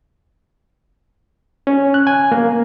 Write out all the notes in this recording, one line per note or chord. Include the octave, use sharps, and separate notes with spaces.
C#4
F#6
G#5
A#3